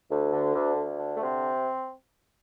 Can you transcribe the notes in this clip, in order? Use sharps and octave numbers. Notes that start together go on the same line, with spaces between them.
D2
D3
D2
D2
D3
A3
C3 C4